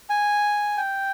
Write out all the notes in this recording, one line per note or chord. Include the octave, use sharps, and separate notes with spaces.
G#5
G5